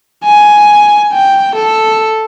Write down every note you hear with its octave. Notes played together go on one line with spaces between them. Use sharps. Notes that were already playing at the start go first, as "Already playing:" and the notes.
G#5
G5
A4